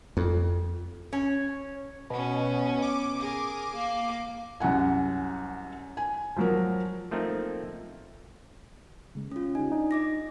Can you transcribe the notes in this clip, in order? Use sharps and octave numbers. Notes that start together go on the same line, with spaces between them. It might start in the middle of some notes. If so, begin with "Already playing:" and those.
F2
C#4
B2 B3 C#4
D6
G#4 A#4
A#3
C2 F#2 F#5 G#5
G#5
F3 F#3 A#4
F3 A3 A#3 C4 D#4 A#4
C#3 G#3
C#4 F4
D#4 G4 G#5
D4 D#4
D#5 D6 A#6